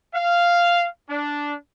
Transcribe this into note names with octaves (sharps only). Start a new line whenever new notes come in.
F5
D4